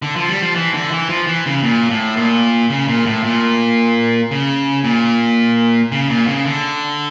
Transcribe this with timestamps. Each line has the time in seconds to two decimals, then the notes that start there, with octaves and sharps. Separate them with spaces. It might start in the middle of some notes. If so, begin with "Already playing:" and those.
0.02 D3
0.16 F3
0.29 G3
0.42 F3
0.55 E3
0.74 D3
0.91 E3
1.09 F3
1.27 E3
1.46 C#3
1.63 A#2
1.90 A2
2.17 A#2
2.70 C#3
2.88 A#2
3.06 A2
3.24 A#2
4.31 C#3
4.84 A#2
5.92 C#3
6.09 A#2
6.27 C#3
6.45 D3